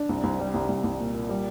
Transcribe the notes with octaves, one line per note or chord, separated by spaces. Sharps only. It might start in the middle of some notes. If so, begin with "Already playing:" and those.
Already playing: D4
C2
C2
G3
C2
C2
C2
A#2
A#2
G3